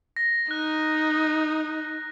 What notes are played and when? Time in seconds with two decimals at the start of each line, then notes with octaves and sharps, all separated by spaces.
0.16 A#6
0.51 D#4 F#6